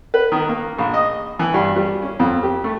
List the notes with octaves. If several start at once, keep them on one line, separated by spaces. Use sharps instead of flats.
B4
D#3
A#3
A#1
D#5
E3
G2
G3
C#4
F2
G4
A3